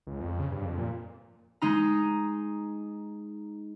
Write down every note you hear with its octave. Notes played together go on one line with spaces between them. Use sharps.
C#2
F2
C#3
G2
F2
A#2
G#3 D#4 A#5